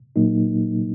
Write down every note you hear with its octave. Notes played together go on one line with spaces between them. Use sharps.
A#2 F#3 A#3 D#4